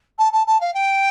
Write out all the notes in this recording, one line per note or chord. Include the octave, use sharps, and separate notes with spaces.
A5
A5
A5
F5
G5